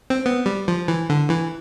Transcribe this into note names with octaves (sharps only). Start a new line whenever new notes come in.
C4
B3
G3
F3
E3
D3
E3